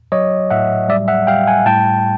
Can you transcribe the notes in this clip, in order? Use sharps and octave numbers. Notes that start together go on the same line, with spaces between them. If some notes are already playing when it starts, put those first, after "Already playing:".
F#3 C#5 D#5
A2 E5 F#5
G3 D5 E5
E5 F#5
G3 F5 G5
F#5 G#5
A2 G5 A5